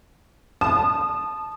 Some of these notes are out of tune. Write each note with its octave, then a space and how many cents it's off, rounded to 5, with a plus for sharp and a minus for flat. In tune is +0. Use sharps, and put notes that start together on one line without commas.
A5 -10 D#6 -30